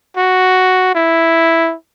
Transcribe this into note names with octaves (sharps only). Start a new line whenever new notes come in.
F#4
E4